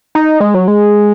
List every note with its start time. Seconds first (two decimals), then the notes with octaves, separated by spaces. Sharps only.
0.15 D#4
0.40 G#3
0.54 F#3
0.68 G#3